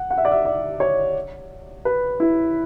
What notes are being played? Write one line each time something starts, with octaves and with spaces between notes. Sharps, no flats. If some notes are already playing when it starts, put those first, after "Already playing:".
Already playing: F#5
F#5
E5
D5
E5
D5
C#5
B4
E4